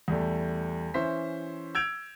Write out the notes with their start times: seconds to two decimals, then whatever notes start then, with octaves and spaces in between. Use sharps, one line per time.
0.08 E2 G3 A3
0.94 E3 C#4 C5 E5 B6
1.75 E6 G6 G#6 D7 F7